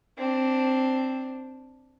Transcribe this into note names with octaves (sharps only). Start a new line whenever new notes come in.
C4 D4